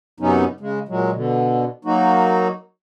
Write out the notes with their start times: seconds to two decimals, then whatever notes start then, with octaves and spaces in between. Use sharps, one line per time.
0.20 F#2 C3 F#3 B3 C#4 D#4
0.60 C#3 G#3
0.88 A#2 F#3 G#3
1.13 B2 D3
1.85 F#3 A#3 D#4 F#4